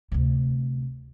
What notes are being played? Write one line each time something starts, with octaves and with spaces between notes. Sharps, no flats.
D2 C3